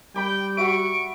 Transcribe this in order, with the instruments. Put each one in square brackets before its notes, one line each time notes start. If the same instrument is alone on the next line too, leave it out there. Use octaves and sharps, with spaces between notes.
[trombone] G3 [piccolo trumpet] G5 [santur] B5 D6
[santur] F#4 E5 [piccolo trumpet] C#6 [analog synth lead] D7